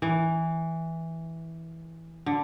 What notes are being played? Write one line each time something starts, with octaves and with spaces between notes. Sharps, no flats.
E3
D3